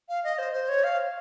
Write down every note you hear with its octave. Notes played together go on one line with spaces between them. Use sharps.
F5
D#5
C5
C5
C#5
F5